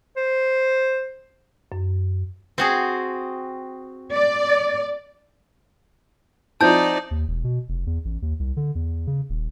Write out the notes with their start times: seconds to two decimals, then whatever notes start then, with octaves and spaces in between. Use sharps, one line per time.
0.17 C5
1.72 F#2
2.58 C4 F#4 G#4
4.12 D5
6.61 F3 C4 D#4 E4 D5 A5 G6
7.11 D#2
7.28 E1
7.44 B2
7.69 F1
7.87 E2
8.05 A1
8.22 D#2
8.39 C2
8.57 D3
8.75 E2
9.07 C#3
9.29 D#1